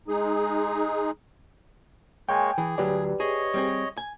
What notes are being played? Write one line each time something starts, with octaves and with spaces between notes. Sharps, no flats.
G#3 D#4 G#4
G#3 A#3 C#5 G5 G#5
E3 G#4
D2 F#3 G4 B4 D5
G#4 C#5 D#5
G3 C4 G#4
G#5